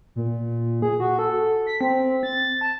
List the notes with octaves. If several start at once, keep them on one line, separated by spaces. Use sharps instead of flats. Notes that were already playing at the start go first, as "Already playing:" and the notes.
A#2
G#4
F#4
A4
B6
C4
A6
A5